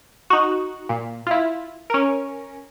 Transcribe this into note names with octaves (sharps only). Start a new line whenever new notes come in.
D#4 F#4
A#2
E4 F4
C#4 A#4